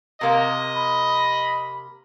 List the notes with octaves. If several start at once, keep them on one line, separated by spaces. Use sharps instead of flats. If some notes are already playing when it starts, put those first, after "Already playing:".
C3 A#3 D#5
B5